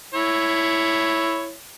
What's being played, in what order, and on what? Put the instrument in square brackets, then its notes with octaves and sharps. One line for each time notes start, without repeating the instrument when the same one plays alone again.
[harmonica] E4 C#5